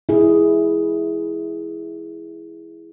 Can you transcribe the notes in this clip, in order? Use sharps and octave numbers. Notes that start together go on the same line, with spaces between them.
E4 G#4